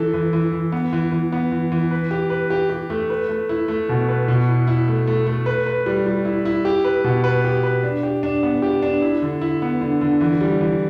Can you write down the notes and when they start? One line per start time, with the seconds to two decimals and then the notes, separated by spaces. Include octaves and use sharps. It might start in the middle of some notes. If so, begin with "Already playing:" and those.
Already playing: E3 E4 A4
0.13 E3
0.33 E3
0.52 E3
0.72 B3
0.93 E3
1.12 E3
1.32 B3
1.52 E3
1.72 E3
1.91 B4
2.11 G4
2.30 B4
2.50 G4
2.70 G4
2.90 A3
3.10 B4
3.29 A3
3.49 E4
3.68 A3
3.89 B2
4.08 B4
4.28 B2
4.48 E4
4.67 E4
4.88 A3
5.07 A3
5.27 A3
5.46 B4
5.66 B4
5.86 G3
6.06 G3
6.25 E4
6.45 E4
6.65 G4
6.85 B4
7.04 B2
7.24 B4
7.44 G4
7.63 B4
7.83 D4
8.03 G4
8.23 D4
8.43 B3
8.62 G4
8.83 D4
9.02 E4
9.22 D3
9.41 E4
9.62 B3
9.81 D3
10.01 D3
10.21 E3
10.41 G3
10.61 E3